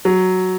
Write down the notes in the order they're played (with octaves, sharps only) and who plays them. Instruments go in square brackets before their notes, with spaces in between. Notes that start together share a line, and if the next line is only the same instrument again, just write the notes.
[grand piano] F#3